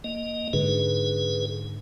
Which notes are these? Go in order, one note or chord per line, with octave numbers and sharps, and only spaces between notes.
A#3 D#5
G#2 D3 G#4 B4